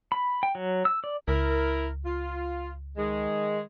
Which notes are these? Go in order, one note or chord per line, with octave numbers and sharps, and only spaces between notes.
B5
G5
F#3
E6
D5
C#2 E4 A#4
F4
D#3 G#3